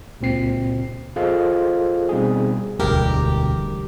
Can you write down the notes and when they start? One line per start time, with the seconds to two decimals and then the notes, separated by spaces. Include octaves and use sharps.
0.21 C#2 A#2 C4 C7
1.16 F4 G#4 A4 C5 D#5 F5
2.09 B2 G3 C4 D#4 G#4
2.80 E1 D2 G2 G4 A#4